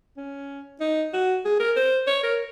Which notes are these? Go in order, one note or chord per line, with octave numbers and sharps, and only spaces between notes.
C#4
D#4
F#4
G#4
A#4
C5
C#5
A#4